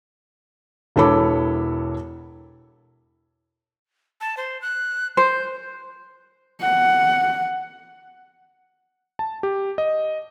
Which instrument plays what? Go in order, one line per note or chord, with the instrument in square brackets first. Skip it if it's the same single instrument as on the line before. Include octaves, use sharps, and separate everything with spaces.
[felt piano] E1 E3 A4 C#5 B5 D6
[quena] A5
C5
F#6
[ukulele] C5 [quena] G6
[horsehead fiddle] F#5
[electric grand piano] A5
G4
D#5